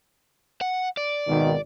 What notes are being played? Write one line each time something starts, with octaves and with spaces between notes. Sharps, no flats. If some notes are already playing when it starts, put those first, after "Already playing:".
F#5
D5
G#1 B2 D#3